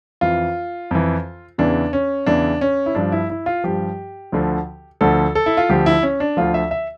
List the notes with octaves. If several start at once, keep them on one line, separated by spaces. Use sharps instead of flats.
F2 E3 F4
F2 E3
E2 C#3 E3 D4
C#4
E2 C#3 E3 D4
C#4
E4
G2 F3 D4
E4
E4
F4
G2 F3 G4
D2 D3 F3
D2 D3 F3 A4
A4
E4
F4
D2 D3 F3 G4
E4
C#4
D4
D2 D3 F3 F4
E5
E5